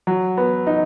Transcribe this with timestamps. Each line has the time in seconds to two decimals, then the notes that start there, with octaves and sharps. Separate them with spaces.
0.07 F#3
0.37 B3
0.67 D#4